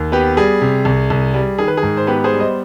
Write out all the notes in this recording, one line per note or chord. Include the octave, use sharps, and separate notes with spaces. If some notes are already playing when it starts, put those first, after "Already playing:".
Already playing: D#2
B3 G4 B4
G3 G#4
C3
C2
C2
G3
D#3 G#4
B4
G#4
G#2
C5
B3 G4 B4
G#4 C5
G3
C5 D#5